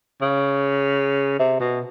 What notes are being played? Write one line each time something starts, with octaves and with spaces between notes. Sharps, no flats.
C#3
C3
B2